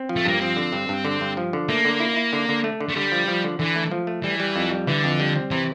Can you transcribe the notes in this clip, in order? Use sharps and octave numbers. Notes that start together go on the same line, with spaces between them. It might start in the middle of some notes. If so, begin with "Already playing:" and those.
Already playing: C4
F3
A3
G2 A#3
F3 C4
D3
G2
G2
D3
G2
F3
D3
A3 A#3
D3
E4
E4
D3
D3
A3
D3
A3
D3 G3
F3
F3
D3
D3 E3
A3
F3
A3
E3 G3
G3
F2
G3
D3 E3
F2
G3
C4
C3 E3